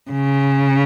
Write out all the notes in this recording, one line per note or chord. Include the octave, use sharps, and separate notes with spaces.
C#3